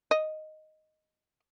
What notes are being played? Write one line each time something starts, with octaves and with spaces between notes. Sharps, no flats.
D#5